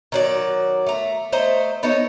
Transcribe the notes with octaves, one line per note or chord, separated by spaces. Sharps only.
D#3 F#3 D5
A3 A#5
A3 C5 D#5 A#5
B3 D#4 A4 C#5